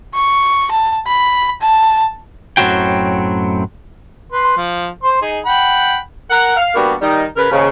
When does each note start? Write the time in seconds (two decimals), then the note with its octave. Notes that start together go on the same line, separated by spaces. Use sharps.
0.15 C#6
0.71 A5
1.07 B5
1.62 A5
2.57 F#2 A2 F#3 C4 F#4 G5
4.32 B4 C6
4.57 F3
5.03 C5 C6
5.22 D#4 G#4
5.46 F#5 G5 B5
6.30 A#4 F#5
6.57 F5
6.74 G3 A#3 B3 D4 F#4
7.01 D#3 G3 D#4
7.36 C#3 A#4 B4
7.51 D#2 G#2 C#3